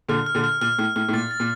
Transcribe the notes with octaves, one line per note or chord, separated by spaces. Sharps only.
A#2 D3 F6
F6
A#2 D3
F6
A#2 F6
A2 F6
A2 F6
A2
A#2 A6
A6
A#2